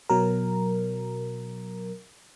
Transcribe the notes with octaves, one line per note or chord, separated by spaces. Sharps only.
B2 F#3 A#4